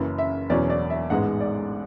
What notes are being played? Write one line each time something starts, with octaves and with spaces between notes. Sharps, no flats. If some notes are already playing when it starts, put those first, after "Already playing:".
Already playing: F#1 F#2 C#3 E3
E5
E1 E2 B2 F#3 C#4 D5
D5
E5
A1 G#2 G#3 B3 F#5
D5